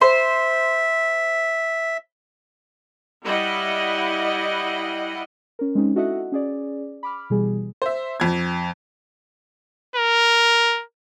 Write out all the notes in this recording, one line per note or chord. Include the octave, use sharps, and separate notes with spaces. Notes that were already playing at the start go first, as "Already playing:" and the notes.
C5 E5
G3 E4 D#5 F#5
C#4 A#4
G#3 C4 C#4 D#4
E4 F#4 A4 D#5 E5 F#5
C#4 G#4 D5
B5 D6 F6
B2 E3 G3 G#4
C5 E5
F2 G#6
A#4